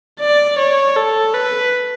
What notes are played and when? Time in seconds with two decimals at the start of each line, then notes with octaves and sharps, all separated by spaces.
0.20 D5
0.58 C#5
0.96 A4
1.33 B4